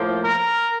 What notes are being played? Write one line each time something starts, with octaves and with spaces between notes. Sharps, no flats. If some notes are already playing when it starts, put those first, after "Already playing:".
Already playing: A2 F3 A#3
A#4